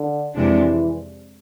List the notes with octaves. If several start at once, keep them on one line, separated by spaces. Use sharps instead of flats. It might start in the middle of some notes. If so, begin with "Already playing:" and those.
Already playing: D3
F2 C3 E3 G#3 D4